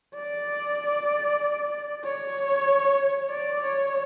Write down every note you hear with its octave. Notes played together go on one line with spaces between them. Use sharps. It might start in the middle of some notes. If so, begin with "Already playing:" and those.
D5
C#5
D5
C#5